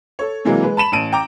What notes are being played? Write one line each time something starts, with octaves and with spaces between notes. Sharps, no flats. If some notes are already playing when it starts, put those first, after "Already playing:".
A4 C#5
C3 E3 F#3 G#3 A#3
G#3 B4
A5 B5 E7 F#7
A1 A5 D7 D#7
G5 A#5 D6